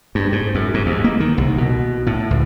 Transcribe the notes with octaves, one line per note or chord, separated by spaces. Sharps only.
G2
G#2
F#2
G#2
D#2
A#3
D#3
C2
B2
A2
C#2